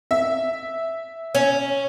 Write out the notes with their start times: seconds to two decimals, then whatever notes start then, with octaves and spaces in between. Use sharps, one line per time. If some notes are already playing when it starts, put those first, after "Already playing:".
0.11 E5
1.35 C#4